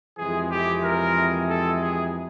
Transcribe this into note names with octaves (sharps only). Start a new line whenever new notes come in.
F2 C3 E3 G#3 G#4
G4
A#4
A4
G#4